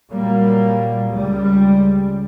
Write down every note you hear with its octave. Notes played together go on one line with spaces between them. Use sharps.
A#2 F#3 G3 A#3
C#2 G3